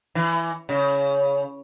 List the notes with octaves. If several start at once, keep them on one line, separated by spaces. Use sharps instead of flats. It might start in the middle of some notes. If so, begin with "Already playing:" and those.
E3
C#3